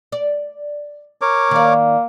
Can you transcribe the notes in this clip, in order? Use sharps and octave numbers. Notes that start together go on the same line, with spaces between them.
D5
A#4 C#5 D6
D#3 A#3 D5